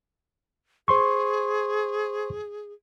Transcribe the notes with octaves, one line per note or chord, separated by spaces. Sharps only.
G#4 C5 C6 C#6